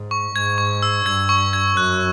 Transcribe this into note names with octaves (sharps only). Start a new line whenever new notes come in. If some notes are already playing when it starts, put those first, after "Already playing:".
Already playing: G#2
C#6
G#2 G#6
C#6
E6
G2 G#6
C#6
G#6
F#2 F#6